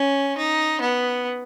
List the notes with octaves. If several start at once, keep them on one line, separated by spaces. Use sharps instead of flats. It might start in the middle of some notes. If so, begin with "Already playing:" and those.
Already playing: C#4
D#4
B3